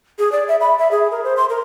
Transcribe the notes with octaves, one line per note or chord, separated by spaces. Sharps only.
G#4
D5
E5
B5
E5
G#4
A#4
C5
C6
A#4